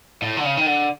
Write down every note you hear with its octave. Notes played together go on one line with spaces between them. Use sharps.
A2
D3
C#3
D#3
D3